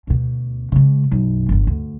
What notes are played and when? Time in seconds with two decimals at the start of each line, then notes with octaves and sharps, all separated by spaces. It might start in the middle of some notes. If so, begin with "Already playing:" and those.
0.07 D2 B2
0.72 C#3 G#3
1.11 B1 F#2
1.49 G1 F2
1.67 D2